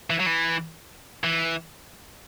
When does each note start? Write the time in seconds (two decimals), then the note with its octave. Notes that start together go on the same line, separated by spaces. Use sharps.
0.10 E3
0.20 F#3
0.26 E3
1.24 E3